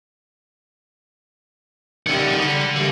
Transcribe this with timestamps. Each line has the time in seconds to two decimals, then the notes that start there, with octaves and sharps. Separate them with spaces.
2.07 D#3 G3 A4 F#5
2.37 G3
2.75 G3 A#3